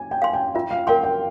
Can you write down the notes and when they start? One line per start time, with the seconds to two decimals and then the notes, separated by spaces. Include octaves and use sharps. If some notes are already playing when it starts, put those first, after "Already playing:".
Already playing: G#5
0.11 G5
0.22 F5 C6
0.33 G5
0.55 F4 E5
0.71 F5
0.87 A#4 F5 G5 C6
1.04 G5